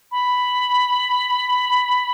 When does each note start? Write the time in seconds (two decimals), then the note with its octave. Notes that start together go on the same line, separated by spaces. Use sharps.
0.12 B5